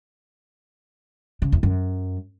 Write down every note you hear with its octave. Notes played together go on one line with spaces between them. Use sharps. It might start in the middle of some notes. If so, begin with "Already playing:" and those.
C#3
E2
F#2